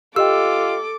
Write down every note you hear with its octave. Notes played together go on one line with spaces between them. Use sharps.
F4 G4 A4 D#5 G5 D6 E6